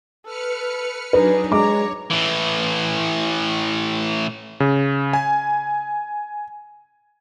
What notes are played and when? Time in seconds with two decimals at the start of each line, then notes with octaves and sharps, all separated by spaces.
0.25 A4 B4 F6 C#7
1.13 F#3 D4 D#4 G#4 B4
1.52 G#3 C#5 A#5 D6
2.10 A2 E3
4.60 C#3
5.13 G#5